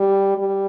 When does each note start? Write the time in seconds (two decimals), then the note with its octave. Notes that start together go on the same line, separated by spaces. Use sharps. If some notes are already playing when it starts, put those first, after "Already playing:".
Already playing: G3
0.38 G3